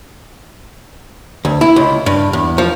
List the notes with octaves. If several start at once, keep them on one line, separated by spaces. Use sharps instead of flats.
D2
E4
C#2
G2
E2
F3